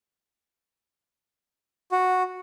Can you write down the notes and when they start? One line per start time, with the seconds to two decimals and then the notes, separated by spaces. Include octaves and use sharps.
1.92 F#4